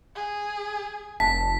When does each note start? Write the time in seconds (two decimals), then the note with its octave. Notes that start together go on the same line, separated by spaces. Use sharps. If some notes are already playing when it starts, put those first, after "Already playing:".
0.16 G#4
1.20 F1 A5 B6